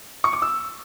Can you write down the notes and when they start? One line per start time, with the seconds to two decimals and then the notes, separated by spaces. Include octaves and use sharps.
0.24 C#6
0.33 D6
0.42 E6